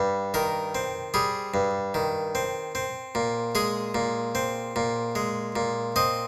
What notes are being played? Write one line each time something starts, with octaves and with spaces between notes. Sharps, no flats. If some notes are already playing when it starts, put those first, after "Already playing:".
Already playing: G2 G3
D#3 A#4
C4
G3 G#4
G2
D#3
C4
C4
A#2
G#3 G#4
A#2
C4
A#2
G#3
A#2
C4 D#5